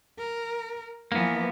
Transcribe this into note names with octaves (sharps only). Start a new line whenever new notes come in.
A#4
E3 F3 A#3 B3